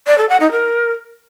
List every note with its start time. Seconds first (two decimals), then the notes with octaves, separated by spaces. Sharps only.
0.07 D5
0.18 A4
0.29 F#5
0.40 D#4
0.52 A#4